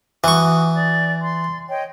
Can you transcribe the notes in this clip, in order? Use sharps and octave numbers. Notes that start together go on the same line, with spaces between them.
E3 F#4 C#6 D#6
D5
C6
C#5 D#5 G5